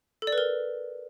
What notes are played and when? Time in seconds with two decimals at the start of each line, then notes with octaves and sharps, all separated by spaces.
0.22 A4
0.27 D5
0.33 B4
0.38 A#4